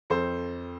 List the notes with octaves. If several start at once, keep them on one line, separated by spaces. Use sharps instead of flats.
F2 A4 C5